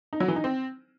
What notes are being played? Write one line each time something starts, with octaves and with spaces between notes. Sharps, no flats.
D#4
F#3
E3
D#4
C4